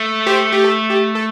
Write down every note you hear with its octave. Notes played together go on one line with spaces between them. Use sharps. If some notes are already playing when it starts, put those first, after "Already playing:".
Already playing: A3
G4 C5
G4
A4
G4
A4